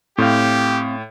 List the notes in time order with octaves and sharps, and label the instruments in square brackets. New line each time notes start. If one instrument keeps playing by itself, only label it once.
[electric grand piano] A2 [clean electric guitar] C4 F5 [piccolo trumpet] G4